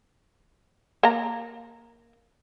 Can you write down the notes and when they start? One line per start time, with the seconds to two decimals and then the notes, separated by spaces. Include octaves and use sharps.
1.03 A#3 A#5